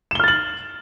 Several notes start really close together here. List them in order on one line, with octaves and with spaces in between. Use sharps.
E7 G7 F6 A6 F#7